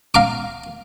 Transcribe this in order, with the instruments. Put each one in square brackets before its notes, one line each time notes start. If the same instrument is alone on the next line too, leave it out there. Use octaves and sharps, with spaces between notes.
[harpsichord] F5 A#5 D6